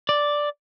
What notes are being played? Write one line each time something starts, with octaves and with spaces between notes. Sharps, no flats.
D5